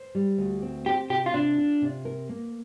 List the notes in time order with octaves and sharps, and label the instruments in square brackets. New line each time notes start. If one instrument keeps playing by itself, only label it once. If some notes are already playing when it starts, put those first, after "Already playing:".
Already playing: [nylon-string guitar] C5
G3
D2
C4
[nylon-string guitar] C4 [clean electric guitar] G4
[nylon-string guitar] C3 [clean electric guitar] G4
[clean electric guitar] F4
[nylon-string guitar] C3 [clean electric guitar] D4
[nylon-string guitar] F4
C3
A#4
A#3